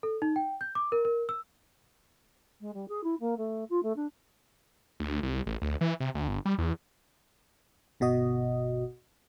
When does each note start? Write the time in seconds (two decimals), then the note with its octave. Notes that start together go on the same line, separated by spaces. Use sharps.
0.03 A4
0.22 D#4
0.36 G5
0.61 G6
0.75 D6
0.92 A#4
1.05 A#4
1.29 E6
2.60 G#3
2.73 G3
2.88 G#4
3.03 E4
3.20 A#3
3.37 A3
3.69 F4
3.82 A3
3.96 D4
5.00 D2
5.22 C2
5.46 A1
5.62 D2
5.81 E3
6.00 C3
6.15 D2
6.28 G1
6.45 G3
6.58 E2
8.00 G1 B2 F#4 D#5